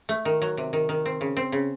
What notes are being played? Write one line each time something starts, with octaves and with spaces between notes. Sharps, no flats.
A3
D#3
F#3
C3
D#3
D#3
C4
C#3
C4
C#3